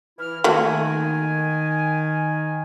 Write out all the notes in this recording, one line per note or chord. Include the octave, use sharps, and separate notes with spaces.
E3 E4 F6
D#3 A3 A#3 F#4 G#5